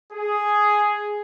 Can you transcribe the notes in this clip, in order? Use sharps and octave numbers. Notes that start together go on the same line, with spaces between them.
G#4